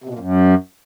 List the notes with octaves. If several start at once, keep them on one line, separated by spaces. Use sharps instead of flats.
C3
B2
A#2
F#2